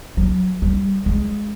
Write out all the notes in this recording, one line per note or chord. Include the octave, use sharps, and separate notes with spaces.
F#3
G3
G#3